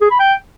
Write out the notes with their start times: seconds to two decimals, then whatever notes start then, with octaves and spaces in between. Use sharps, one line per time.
0.01 G#4
0.10 B5
0.20 G5